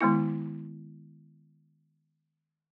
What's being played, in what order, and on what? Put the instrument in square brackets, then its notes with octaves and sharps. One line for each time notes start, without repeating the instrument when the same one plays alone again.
[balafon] D#3 G#3 B3 E4